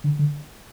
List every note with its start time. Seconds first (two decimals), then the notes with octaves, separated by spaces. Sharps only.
0.04 D3
0.19 D3